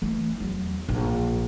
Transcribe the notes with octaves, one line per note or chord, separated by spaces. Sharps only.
E3 A3
E2 F#3
A#1